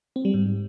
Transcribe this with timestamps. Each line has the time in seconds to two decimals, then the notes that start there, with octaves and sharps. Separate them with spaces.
0.16 C4
0.25 G3
0.34 G#2